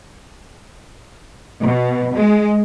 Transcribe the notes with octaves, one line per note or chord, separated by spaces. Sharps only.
B2
G#3